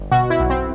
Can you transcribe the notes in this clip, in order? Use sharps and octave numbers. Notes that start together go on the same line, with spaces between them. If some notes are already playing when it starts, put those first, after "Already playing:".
Already playing: G1
B2 F#4
E4
B1
C4